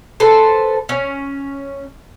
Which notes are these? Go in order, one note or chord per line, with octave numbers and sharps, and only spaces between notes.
A4 B4 C5
C#4